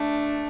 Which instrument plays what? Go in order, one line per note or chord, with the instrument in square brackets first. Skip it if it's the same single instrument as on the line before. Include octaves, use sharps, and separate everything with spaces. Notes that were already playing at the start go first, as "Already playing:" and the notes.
Already playing: [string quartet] A3 D4